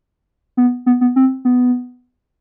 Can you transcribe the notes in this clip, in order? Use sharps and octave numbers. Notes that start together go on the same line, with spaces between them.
B3
B3
B3
C4
B3